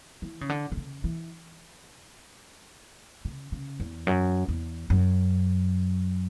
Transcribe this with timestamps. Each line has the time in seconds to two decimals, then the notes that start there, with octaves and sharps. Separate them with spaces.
0.22 E3
0.41 C#3
0.49 D3
0.72 D3
0.77 C#3
1.04 E3
3.25 C#3
3.52 C#3
3.80 E2
4.07 F#2
4.49 E2
4.90 F#2